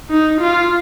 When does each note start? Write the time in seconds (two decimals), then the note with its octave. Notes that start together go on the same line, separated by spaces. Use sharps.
0.10 D#4
0.41 F4